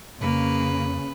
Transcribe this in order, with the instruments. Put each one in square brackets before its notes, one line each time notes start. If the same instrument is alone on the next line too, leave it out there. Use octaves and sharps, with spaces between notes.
[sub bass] F2 [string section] C#3 [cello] A#3 [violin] B4